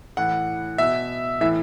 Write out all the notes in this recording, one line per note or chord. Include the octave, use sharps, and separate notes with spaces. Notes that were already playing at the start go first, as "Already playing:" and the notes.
A2 E3 F#5
B2 E5
A2 E3 E5